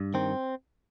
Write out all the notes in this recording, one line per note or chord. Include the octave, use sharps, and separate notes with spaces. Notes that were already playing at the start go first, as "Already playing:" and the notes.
Already playing: G2
D#3 C4